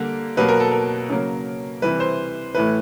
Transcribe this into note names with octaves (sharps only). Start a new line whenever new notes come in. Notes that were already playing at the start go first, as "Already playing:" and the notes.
Already playing: D3 G3 A#3
B2 F#3 A#3 B4
A#4
A4
A#4
C#3 F#3 A#3
C3 E3 G3 B4
C5
A2 E3 A3 B4